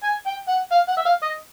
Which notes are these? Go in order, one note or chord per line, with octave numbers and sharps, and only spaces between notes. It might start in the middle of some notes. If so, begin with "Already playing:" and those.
G#5
G5
F#5
F5
F#5
E5
F5
D#5